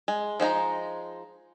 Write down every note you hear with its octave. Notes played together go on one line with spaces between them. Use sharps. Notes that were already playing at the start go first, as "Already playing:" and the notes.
G#3
F3 G#3 D#4 A#5